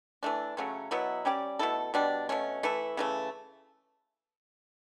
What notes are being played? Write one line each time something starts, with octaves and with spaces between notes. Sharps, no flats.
E3 A3 D4
C#3 F#3 A3 C#4
B2 F#3 B3 E4
G3 C#4 G4 D5
B2 A3 E4 A4
B2 G3 D4
B2 A3 C#4
E3 A3 E4
C#3 E3 A3